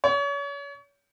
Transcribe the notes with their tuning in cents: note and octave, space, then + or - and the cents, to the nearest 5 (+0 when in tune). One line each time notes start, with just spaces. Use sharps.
C#5 +35